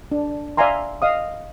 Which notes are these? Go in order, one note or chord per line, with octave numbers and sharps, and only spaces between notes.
D4
D5 E5 F5 G#5 A#5 C6
D#5 F5 D#6